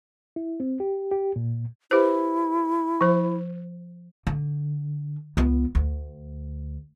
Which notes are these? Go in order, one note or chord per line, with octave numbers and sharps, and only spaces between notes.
E4
C4
G4
G4
A#2
E4 G4 B4 C5
F3 C5
D3
C#2 B3
D2